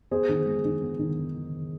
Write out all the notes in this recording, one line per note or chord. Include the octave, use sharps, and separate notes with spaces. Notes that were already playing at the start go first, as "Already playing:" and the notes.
B3 G#4 C5
D#3
G#3
D#3
B3
D#3